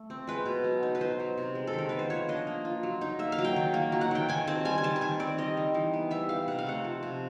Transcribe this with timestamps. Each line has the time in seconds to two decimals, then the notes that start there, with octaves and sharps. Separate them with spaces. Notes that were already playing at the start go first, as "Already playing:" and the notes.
Already playing: A3
0.10 C4
0.27 G#3 B4
0.46 B2
0.64 F#3
0.83 D#4
0.95 B4
1.01 B3 C5
1.20 F#3
1.38 C3
1.55 G#3
1.67 A4
1.73 D#3
1.78 A#4
1.89 B3 B4
1.99 C5
2.10 F3 C#5
2.29 D4 D#5
2.47 A#3
2.65 F4
2.83 F#3
3.01 D#4
3.19 A#3 E5
3.32 F5
3.38 F#3
3.45 G5
3.56 D#3
3.74 A#3
3.92 F#3
4.01 F#5
4.11 D#3 G5
4.29 D#3 G#5
4.47 C4 A5
4.65 G3 G#5
4.78 G#5
4.83 D#3 A5
4.96 A5
5.01 D#3 G#5
5.20 C4 D5
5.38 G3 D#5
5.57 D#3
5.74 E3
5.93 B3
6.11 G3 E5
6.29 D#4 F5
6.48 C3 F#5
6.59 F5
6.67 A3 F#5
6.84 F3
7.03 C3